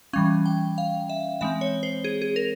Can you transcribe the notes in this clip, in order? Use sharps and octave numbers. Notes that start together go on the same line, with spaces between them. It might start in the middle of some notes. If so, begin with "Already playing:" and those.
E3 G3 C#4 F5
G5
F5
E5
E3 G#3 C4 E5
C#5
C5
G#4
G#4
A#4